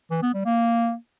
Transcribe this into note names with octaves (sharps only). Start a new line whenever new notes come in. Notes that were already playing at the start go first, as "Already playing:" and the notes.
E3
B3
G3
A#3